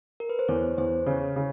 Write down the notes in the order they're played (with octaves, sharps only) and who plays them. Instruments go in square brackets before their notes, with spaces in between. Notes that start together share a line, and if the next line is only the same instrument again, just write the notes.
[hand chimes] A#4
B4
C5
[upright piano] E2 [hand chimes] C#5
[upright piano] E2 [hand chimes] C5
[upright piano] C#3 [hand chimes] C#5
[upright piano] C#3